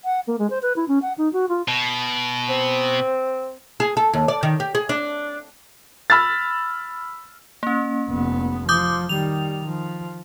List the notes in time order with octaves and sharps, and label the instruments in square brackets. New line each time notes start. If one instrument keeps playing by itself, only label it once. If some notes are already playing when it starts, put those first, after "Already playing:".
[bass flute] F#5
A#3
G#3
C5
B4
E4
C#4
F#5
D#4
F#4
F4
[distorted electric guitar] B2
[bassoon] C4
[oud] G#4
A4
D#2
D5
D#3
G4
G#4
D4
[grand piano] B5 E6 F6 A6
[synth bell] A#3 C#4
[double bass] F1 B3
[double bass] F3 [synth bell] D6 D#6 G6
[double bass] D#3 G3 [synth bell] F7
[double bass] F3